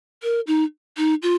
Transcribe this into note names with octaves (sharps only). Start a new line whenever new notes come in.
A#4
D#4
D#4
F4